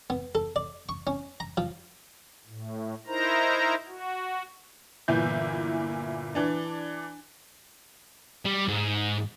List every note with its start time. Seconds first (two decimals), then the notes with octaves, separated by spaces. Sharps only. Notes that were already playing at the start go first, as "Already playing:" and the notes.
0.10 B3
0.35 A4
0.56 D5
0.89 C#6
1.07 C#4
1.40 A#5
1.57 F3
2.47 A2
3.07 D#4 E4 A#4 C5 A#5
3.88 F#4
5.08 G1 A#2 E3 E4 G6
6.35 E3 D4
8.45 G3
8.68 G#2